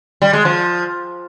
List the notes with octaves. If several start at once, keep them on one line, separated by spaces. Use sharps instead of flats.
G3
G#3
F3